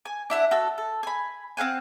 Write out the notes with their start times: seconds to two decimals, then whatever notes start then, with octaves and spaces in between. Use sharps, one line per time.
0.05 G#5
0.30 D4 E4 E5 F#5
0.51 F#4 A4 E6
0.78 A4
1.03 G#5 B5
1.57 C4 F5 F#5 G#5